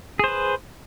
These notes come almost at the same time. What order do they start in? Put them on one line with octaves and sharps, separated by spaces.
G#4 C5 B4